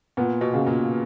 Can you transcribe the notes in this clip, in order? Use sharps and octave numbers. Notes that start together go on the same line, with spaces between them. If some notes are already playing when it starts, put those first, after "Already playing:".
A#2 B3
B2
C#3
A#2